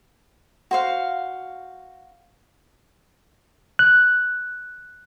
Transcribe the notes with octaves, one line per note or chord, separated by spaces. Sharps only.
F#4 C5 F5
F#6